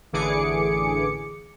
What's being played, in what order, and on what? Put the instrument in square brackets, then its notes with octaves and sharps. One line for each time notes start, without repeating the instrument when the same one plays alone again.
[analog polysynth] A1 D3 E3 G#4 D6 C#7